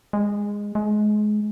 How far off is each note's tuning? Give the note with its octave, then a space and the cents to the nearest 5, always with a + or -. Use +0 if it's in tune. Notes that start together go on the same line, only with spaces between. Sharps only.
G#3 -15
G#3 +25